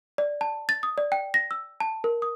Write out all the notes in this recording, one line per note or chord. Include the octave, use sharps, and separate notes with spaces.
D5
A5
A6
D#6
D5
G5
A#6
E6
A5
A#4
D#6